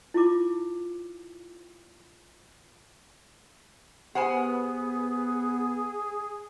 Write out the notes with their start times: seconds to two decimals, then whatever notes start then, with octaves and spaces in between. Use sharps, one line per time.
0.14 E4 F4 D6
4.15 B3 G4 G#4 C5 F#5 G#5 B5